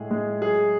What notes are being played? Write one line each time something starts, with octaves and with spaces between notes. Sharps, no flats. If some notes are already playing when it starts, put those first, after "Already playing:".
Already playing: A2 G#3 G#4
G#3
F#3 G#4